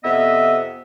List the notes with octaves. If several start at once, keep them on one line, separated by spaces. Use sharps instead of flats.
F2 C3 B3 D#5 E5